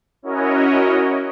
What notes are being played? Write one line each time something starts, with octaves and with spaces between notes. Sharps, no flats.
C#4 E4 F#4 A#4 C#5 D#5